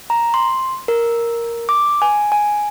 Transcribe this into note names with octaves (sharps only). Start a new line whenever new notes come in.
A#5
C6
A#4
D6
G#5
G#5